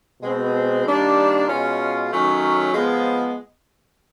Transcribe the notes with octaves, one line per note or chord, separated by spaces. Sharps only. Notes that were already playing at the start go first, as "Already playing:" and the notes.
B2 G#3 C4
D#3 G3 A#3 D4
B2 G#3 C#4 F4
D#3 F#3 A3 C#4
F3 G#3 B3